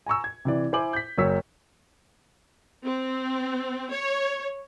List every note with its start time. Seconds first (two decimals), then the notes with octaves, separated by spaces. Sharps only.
0.06 G#5 A#5 C#6 E6
0.24 G#6
0.45 C3 E3 D5
0.73 E4 C5 G#5 D6 F#7
0.93 G6 B6
1.18 F#1 F#3 C#5 E6 B6
2.86 C4
3.91 C#5